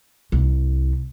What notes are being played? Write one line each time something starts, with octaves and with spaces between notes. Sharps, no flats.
C2